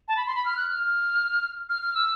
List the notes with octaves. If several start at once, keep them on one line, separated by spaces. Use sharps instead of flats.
A5
B5
C6
B5
F6
F#6
F6
F6
F6
E6